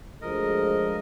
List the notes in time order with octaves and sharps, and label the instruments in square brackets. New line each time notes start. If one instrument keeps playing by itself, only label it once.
[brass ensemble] D2 F3 G#3 [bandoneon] A#4 D#5